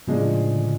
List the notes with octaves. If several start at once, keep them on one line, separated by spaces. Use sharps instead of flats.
A2 C#3 F3 G#3 D4
D3